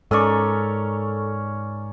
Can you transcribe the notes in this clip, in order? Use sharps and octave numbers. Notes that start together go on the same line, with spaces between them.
G#2 C#4 A4 A#4 D5 C#6